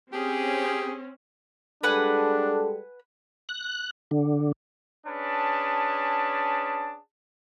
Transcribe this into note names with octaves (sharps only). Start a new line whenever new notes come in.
C4 C#4 G4 G#4
G3 G#3 D4 A4 B4 F#5 G#5
F#6
D3
C#4 D4 G#4 B4 A5